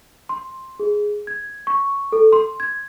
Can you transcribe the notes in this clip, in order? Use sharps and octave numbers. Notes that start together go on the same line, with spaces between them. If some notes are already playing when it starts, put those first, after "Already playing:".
C6
G#4
G#6
C#6
A4
C6
G#6